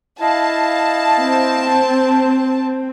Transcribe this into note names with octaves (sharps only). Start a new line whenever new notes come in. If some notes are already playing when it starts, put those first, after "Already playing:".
E4 D#5 F5 A5
C4